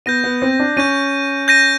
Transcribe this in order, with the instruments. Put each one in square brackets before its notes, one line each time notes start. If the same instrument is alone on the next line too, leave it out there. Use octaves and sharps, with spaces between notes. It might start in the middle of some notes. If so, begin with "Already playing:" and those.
[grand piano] B3 [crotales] G6 A#6 D#7
[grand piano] B3
C4
D4
[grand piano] C#4 [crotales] G6 A#6 D#7
[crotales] G6 A#6 D#7